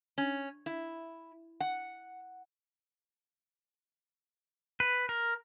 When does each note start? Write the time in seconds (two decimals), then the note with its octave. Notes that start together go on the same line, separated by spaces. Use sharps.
0.18 C#4
0.66 E4
1.60 F#5
4.80 B4
5.09 A#4